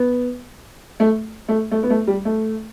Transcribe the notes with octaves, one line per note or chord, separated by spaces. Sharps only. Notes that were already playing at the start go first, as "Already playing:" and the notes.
Already playing: B3
A3
A3
A3
B3
A3
G3
A3